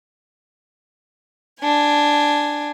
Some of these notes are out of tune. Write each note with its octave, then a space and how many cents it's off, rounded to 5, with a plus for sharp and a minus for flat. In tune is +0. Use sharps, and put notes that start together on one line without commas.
D4 +0 G#5 +0